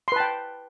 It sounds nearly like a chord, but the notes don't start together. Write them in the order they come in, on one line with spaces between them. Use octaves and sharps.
C6 B4 A5 G5